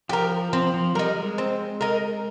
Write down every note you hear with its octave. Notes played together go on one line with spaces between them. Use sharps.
F3 G4 A#4
F3 C4
F3
G3 D#4 A#4
G#3
C4
D#4 A#4